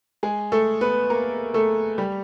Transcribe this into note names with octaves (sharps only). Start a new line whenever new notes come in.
G#3 G#4
A3 A4
B3 B4
A#3 A#4
A3 A4
G3 G4